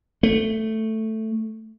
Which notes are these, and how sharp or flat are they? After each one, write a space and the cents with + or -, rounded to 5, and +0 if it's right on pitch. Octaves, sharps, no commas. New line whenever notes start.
A3 +5